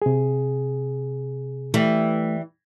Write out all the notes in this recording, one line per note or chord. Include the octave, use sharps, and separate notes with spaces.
C3 G#4
E3 G3 A3